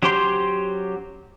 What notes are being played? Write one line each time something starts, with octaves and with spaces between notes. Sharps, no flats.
F#3 C#4 G4 C5 C6